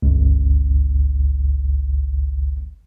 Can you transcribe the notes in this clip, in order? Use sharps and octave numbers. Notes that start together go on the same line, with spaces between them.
G1 C#2